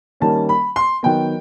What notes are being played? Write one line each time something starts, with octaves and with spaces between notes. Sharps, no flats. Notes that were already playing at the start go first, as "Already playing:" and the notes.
D#3 G3 A#3 C#4 A5
B5
C6
D#3 F#3 B3 G5